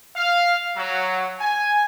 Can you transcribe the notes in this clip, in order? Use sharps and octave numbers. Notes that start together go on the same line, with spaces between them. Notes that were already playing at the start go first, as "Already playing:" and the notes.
F5
F#3
G#5